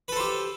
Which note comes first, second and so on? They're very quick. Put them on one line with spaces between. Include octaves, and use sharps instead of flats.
B4 A4 C5 G4